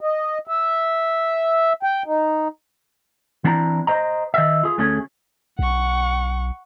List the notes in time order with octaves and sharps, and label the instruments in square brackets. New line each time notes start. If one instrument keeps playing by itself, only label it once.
[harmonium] D#5
E5
G5
D#4
[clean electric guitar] E3 C4 D4 E4 A#5
C5 D#5 A#5
D#3 D#5 E5
F4 G#4
D2 A3 C#4 G#4 C#5
[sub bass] B1 [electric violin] F#5 C#6